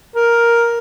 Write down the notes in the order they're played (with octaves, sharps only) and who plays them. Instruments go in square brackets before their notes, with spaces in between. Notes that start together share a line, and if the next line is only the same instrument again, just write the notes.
[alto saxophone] A#4